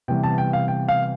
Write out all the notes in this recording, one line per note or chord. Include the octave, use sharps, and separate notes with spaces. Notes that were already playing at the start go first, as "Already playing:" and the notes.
C3 E3 G3 B3 G5
A5
G5
F5
G5
F5